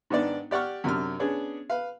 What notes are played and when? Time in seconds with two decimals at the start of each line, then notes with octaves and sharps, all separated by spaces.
0.10 G#2 D#3 B3 D4 D5
0.51 G4 D5 F#5 C#6 F6
0.84 F#2 C3 D4 F6
1.19 B3 C#4 D4 G#4
1.70 B4 F5